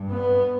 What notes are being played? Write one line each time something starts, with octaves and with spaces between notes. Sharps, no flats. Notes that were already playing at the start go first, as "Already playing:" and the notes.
Already playing: G2
B3